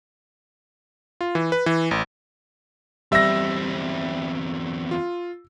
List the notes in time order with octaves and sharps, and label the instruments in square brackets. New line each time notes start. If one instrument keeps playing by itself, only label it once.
[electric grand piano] F4
E3
B4
E3
A1
[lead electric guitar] E2 C4 [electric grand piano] G3 E5 [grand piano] E6 A#6
[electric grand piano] F4